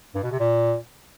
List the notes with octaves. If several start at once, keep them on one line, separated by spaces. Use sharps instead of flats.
G2
B2
C3
A#2